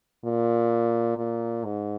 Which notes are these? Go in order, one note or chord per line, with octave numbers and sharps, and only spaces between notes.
A#2
A#2
G#2